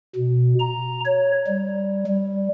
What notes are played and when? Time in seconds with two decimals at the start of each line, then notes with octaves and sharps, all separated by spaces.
0.15 B2
0.60 A#5
1.05 C#5
1.47 G3
2.06 G3